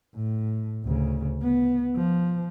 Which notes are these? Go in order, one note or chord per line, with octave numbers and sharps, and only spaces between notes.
A2
D2 C#3
B3
F3